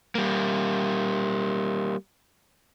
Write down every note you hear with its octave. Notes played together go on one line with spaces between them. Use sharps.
G3 A#3